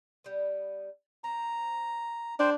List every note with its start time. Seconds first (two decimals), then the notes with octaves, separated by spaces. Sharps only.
0.24 G3 B3
1.24 C4 A#5
2.40 A2 C#3 D4 C5 G5